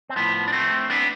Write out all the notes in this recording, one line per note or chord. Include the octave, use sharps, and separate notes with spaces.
C4
A2 F3 B3
D4
A3 C4
B3 D4